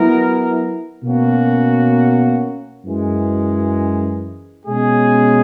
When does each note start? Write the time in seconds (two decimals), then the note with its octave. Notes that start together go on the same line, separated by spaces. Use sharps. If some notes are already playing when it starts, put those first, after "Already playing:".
Already playing: F#3 B3 E4 A#4
1.03 B2 A#3 C#4 F#4
2.84 F#2 E3 G#3
4.66 B2 G#3 C#4 G#4